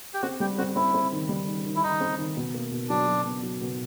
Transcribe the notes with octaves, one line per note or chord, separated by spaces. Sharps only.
G4
C4 F#4
G3 G4
C4 F#4
C4 E4
C4
D#3
G3
D#3
D#3
E4
D#3 D#4
C4
D#3
B2
A#3
B2
F#3 D4
F#3
B2
F#3
B2